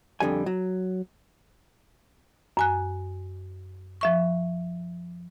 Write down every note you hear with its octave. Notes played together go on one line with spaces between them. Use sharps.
F2 D3 G3 G#5
F#3
F#2 G#5 F#6
F3 E5 C#6